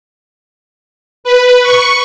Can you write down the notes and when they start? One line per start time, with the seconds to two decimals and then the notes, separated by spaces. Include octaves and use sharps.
1.24 B4
1.63 C#6